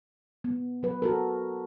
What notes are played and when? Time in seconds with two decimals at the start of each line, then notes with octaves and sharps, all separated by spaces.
0.44 B3
0.83 F#3 B4
1.02 F#4 A4 A#4